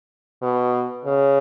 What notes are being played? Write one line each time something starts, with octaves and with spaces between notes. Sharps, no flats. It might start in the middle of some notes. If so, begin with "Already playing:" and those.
B2
C#3